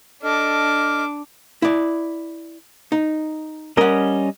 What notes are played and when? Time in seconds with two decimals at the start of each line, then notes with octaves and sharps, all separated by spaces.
0.22 D4 A4 D#5 D6 F6
1.62 E4 D5
2.92 D#4
3.77 G3 C#4 A#4 D#5 F#5